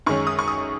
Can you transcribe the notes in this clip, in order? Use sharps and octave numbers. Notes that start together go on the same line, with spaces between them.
F#2 D#3 G#3 C#4 C#6
D#6
C#6
D#6